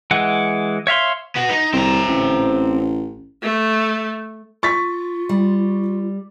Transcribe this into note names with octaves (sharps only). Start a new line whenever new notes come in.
E3 G#3 F#5
C#5 E5 F5 C6
B3 F#4
D#4
C2 C4 A#5
A1
A3
F4 C#6 A6 B6
G3